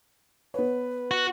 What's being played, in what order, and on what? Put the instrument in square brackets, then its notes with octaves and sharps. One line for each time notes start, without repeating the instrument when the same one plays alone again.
[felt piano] B3 C#5 [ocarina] B4
[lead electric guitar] F#4